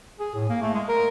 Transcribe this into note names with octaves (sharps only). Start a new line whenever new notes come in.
G#4
A2
A#3
A3
G#3
A#4